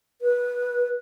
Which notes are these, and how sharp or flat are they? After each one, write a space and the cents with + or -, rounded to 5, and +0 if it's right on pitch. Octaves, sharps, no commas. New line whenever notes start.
B4 -20